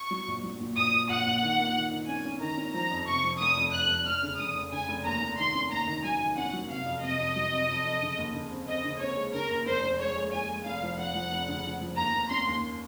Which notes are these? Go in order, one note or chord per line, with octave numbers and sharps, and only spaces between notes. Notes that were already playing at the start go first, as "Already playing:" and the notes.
Already playing: C#6
F#3
A#1
F#3
A#2
A#1 D#6
A#2
A#1 F#5
A#2
D#3
A#3
D#3
D#3
C#4 G#5
C#4
D#3 A#5
C#4
F3 A#5
F2
C3 C#6
F3
F1 D#6
F2
F2 F#6
F1
F1 F6
C#3
F1 D#6
F1
C#3 G#5
F1
D#2 A#5
F1
D#3 C6
C#4
D#2 A#5
D#3
F#3 G#5
D#3
C#4 F#5
F#3
C3 F5
F2
C3 D#5
F2
F#3
C3
F2
F2
C#3
D#2
C#3
C4
C4 D#5
C#3
C4 C#5
G#3
C#3 A#4
D#2
F1 C5
F1
G#3 C#5
G#3
G#3 G#5
G#3
F1 F5
F3
F1 F#5
F3
F1
C#3
F3
F3
D#2 A#5
A#3
C#4 C6
D#2